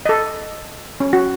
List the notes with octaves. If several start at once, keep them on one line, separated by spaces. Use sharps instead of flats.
A4 D#5
C#4
F#4